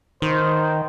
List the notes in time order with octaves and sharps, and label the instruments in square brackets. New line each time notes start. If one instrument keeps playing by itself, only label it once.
[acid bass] D#3 [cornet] C5